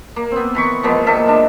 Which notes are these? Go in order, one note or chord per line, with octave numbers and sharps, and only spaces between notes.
A#3
B3 C4
E3 B5 C#6
F3 G#3 A#3 B3
A#2 D#3 A4 E5
G#3 D4